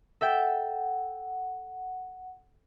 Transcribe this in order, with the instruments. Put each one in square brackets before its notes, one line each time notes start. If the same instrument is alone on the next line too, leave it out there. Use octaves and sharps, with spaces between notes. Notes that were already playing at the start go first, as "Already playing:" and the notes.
[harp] A4 E5 G5 [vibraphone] F#5